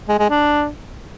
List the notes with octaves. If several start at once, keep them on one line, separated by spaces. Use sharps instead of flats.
G#3
G#3
D4